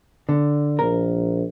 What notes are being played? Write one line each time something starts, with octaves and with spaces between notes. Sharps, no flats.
D3
A#1 A#4